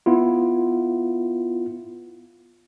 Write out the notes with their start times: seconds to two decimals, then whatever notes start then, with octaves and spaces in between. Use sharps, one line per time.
0.06 B3 E4 F4